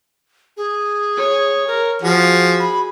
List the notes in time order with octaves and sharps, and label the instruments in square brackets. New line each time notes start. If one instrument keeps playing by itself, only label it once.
[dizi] G#4
[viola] C#5
[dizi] A#4
[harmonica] F3 [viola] F#4 G#4 [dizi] F#5
[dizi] B5